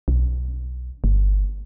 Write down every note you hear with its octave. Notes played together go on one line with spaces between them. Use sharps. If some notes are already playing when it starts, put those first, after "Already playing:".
B1
G1